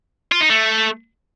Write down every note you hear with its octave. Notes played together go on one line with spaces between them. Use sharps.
F4
D#4
A3